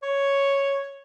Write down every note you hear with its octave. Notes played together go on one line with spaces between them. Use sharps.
C#5